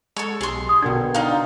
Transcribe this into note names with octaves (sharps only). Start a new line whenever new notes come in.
G#3 A4 C#5
B1 G4 G#4 C6
D#6
B2 D3 D4 A#4 G5 G#6
D#4 F4 D5 F5 A#5